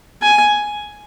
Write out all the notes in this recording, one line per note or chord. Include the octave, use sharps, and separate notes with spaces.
G#5